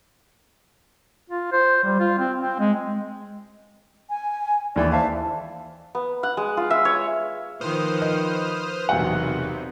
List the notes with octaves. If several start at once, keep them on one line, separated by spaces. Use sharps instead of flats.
F4
C5
G3
F4
C4
C4
G#3
G#5
D#2 E3 D5
C5 E5 F5 A5
B3
F#5
G#3
F4
E5
C#5
D#3 F3 B4 C5 D#6 F6
D#5
E1 C3 F#3 D#4 F5 F#5